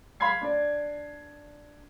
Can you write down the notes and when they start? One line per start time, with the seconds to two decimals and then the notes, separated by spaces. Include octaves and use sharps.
0.20 F5 B5 C6 G#6 C7
0.41 D4 D5